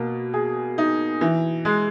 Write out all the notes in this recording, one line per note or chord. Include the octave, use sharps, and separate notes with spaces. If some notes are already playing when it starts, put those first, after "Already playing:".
Already playing: B2 A#3
G#4
D#4
E3
G#3